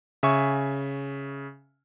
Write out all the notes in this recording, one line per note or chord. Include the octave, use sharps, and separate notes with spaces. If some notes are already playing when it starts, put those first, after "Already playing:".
C#3 E5 G#5 C#6